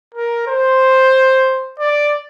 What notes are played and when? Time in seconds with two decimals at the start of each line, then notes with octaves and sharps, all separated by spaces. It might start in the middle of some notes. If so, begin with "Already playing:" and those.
0.15 A#4
0.47 C5
1.79 D5